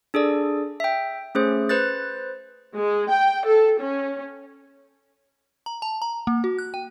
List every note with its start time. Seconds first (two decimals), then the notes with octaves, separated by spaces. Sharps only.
0.14 D4 G#4 A4 D5
0.80 E5 G5
1.35 A3 C#4 G#4 C5
1.69 B4 C5 F#6 A6
2.76 G#3
3.11 G5
3.47 A4
3.80 C#4
5.66 A#5
5.82 A5
6.02 A#5
6.27 A#3
6.44 F#4
6.58 F#6
6.74 G5